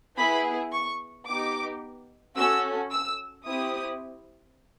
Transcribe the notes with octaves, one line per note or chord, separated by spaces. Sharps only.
B3 E4 G#4 B5
C#6
B3 D#4 G4 D6
C#4 F#4 A4 E6
E6
C4 E4 G4 D#6